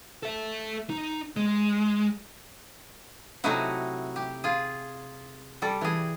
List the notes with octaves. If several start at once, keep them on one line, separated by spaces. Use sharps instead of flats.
A4 E5
D#4
G#3
C3 F#3 A3 D#4 E4 F#4
G4
F4 G#4
G3 A4 D5
E3 G#4